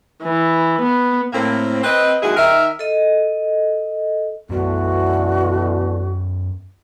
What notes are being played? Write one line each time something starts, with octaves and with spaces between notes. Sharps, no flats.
E3
B3
A2 A#3 C4
C4 B4 D#5
D#2 F#3 G#3 E4 F#4 G#4
D#3 A#4 E5
A4 D#5
F#2 B2 D3 E3 B3 F#4